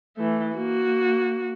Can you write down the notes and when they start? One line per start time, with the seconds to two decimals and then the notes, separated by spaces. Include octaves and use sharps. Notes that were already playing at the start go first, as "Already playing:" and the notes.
0.17 E3 A3
0.55 A#3 F#4